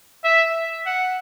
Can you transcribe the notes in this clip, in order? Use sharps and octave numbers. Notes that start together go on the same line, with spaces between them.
E5
F#5